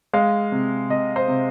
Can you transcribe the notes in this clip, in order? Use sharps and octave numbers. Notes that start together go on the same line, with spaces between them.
G#3 F5
C3
C3 D#5
C5
C3